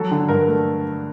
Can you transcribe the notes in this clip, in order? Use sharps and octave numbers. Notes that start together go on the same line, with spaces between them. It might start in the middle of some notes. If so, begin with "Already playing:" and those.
Already playing: F#3 A4
D3
G2 A#4
A3